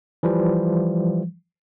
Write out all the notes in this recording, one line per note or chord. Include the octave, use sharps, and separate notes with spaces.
E3 F3 G3